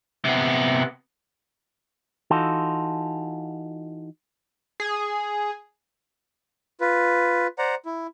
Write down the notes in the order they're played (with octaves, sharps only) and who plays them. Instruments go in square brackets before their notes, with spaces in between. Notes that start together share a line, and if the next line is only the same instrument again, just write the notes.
[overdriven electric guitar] C3 B3
[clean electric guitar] E3 D#4 F4 F#4 A4
[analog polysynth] G#4
[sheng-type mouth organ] F4 B4
C5 D5 F#5 A#5
E4